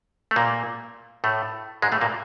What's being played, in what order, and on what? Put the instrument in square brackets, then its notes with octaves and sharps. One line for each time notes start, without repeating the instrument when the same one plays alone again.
[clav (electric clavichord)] A3
A#2 A#3
A2 A3
G#2 G#3
A2 A3
A#2 A#3